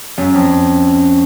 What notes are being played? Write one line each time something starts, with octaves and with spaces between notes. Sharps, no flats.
F#2 C#4
F2 C#5
C#4
C#4
C#4
C#4